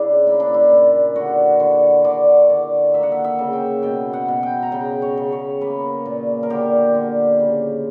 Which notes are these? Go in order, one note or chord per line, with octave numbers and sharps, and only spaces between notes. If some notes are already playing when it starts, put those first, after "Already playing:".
Already playing: C#3 D4 E4
A#3 E4
D4
E4
A#2
D3 F#4
D3
D3 D5
D3 D5
A#3 E5
F#5
E5
E5
C#3
G5
B2 G5
F#5
B2
G5
A#5
C#3 G5
C#5
C#3
C#5
A#3 B4
A#2
A#4
D3 G4
D3
C#3